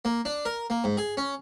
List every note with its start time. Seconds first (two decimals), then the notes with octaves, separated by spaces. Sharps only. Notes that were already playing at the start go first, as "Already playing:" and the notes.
0.05 A#3
0.25 D4
0.45 A#4
0.70 A#3
0.84 G#2
0.97 G#4
1.17 C#4